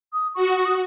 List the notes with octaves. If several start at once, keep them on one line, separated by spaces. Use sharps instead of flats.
D#6
F#4 C#6
C#6
C#6
D#6